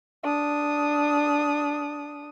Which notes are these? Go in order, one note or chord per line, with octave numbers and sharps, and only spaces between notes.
D4 D#6